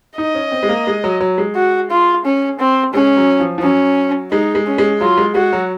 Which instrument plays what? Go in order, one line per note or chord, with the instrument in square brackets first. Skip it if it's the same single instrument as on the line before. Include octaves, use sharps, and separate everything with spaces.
[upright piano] D#4 [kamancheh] D#5
[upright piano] C#4
C4
G#3
A#3
G#3
F#3
F#3
G#3
[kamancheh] F#4
F4
C#4
C4
[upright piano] G#3 [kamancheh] C#4
[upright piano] F#3
F3
F3
[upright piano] F#3 [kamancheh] C#4
[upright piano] G#3 [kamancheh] D#4
[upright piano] G#3
[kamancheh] C#4
[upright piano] G#3
[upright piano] F#3 [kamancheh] F4
[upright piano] G#3
[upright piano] G#3 [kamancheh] F#4
[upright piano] F#3